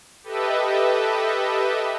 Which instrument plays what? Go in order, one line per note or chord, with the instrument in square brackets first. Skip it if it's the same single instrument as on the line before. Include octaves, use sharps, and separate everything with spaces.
[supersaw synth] G4 A4 B4 D#5 E5